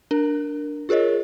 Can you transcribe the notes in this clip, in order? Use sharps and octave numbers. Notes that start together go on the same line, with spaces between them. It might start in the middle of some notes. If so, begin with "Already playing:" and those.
D4 A#4
F4 G#4 A#4 C#5 D#5